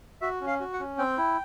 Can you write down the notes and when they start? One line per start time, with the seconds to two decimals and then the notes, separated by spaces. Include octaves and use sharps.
0.21 F#4 E5
0.41 C#4
0.47 F5
0.60 F#4
0.73 F#5
0.80 C#4
0.98 C4 G5
1.18 E4